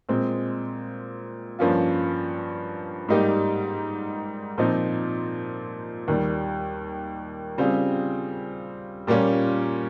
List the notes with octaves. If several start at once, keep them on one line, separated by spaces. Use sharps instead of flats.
A#2 G#3 C4
G2 F3 A#3 C#4 F4
G#2 G3 A#3 D#4 G4
A#2 F3 C4 D#4
D#2 D#3 G3
C#3 G3 C4 F4 G#4
A#2 G3 A#3 C#4 F4